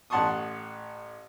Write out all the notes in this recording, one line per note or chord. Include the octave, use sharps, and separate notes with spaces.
A1 F#5 A5 C6 C#6 D#6